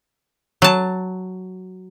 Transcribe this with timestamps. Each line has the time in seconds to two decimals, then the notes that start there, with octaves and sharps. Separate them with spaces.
0.62 F#3 A5